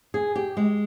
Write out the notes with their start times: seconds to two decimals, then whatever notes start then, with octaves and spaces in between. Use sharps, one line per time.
0.14 G#4
0.36 G4
0.57 G#3